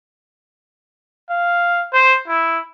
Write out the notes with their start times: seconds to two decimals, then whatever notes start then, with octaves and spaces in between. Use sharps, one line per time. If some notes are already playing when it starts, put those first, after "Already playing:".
1.30 F5
1.93 C5
2.28 E4